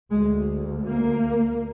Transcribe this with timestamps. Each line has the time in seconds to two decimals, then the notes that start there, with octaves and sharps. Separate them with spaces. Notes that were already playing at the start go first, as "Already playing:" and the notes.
0.10 D2 G#3
0.86 A#3